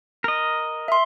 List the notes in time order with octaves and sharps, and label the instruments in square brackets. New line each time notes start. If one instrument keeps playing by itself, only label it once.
[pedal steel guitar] A#4 D#5
[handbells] E5 C6